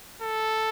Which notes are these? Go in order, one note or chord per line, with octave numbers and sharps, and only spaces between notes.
A4